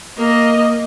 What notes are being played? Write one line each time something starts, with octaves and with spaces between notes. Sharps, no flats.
A#3 D#5